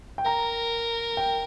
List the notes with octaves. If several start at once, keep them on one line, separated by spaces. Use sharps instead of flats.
G5
A#4 A#5
G5